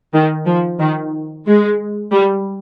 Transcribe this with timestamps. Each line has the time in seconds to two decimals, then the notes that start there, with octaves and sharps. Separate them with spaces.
0.14 D#3
0.46 F3
0.80 D#3
1.46 G#3
2.12 G3